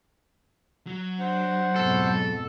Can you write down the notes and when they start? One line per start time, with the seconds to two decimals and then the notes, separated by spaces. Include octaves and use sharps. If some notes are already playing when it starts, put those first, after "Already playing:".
0.87 F#3
1.20 D4 C5 F#5
1.76 F2 G#2 B2 A4